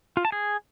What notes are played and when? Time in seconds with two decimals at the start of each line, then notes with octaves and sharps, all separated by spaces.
0.17 F4
0.25 A5
0.32 G#4